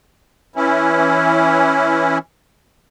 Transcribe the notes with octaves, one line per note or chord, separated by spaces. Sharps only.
E3 C#4 E4